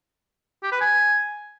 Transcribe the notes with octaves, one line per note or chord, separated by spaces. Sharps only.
G4
B4
G#5